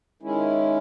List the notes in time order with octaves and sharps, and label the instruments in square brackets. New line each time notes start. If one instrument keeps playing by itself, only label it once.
[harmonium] D#3 G#3 C#4 E4